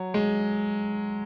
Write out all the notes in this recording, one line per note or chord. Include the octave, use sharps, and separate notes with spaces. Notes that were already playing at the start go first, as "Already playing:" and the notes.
Already playing: F#3
G#3